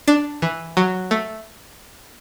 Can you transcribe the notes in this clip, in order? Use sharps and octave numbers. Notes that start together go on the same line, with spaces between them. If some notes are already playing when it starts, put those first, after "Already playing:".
D4
E3
F#3
A3